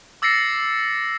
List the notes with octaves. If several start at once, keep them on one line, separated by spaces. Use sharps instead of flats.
D6 E6 A6 A#6 C7 C#7